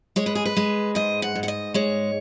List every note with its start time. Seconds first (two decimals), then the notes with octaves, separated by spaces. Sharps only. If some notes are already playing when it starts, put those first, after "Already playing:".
0.16 G#3 C#5
0.26 B4
0.35 G#4
0.45 B4
0.57 G#3
0.95 G#2 D#5
1.22 F#5
1.35 G#2
1.43 F#5
1.48 D#5
1.74 G#3 C#5